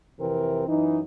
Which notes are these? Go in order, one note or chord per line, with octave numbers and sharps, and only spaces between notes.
F2 C3 E3 C4 A#4
F#2 E3 D#4